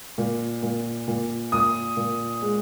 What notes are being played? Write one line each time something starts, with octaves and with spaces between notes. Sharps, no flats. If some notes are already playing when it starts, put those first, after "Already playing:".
A#2
A#2
A#2
A#2 D#6
A#2
G#3